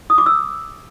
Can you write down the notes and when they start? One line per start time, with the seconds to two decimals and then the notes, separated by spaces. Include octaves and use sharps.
0.10 D#6
0.18 D6
0.26 E6